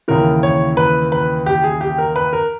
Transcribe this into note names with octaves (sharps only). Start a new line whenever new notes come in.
D#2 C#3 E3 A#4
C#5
B4
B4
G4
G#4
G4
A#4
B4
A#4